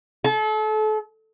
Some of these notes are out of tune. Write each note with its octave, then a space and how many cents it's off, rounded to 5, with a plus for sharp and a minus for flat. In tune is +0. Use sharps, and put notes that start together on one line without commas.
A4 -35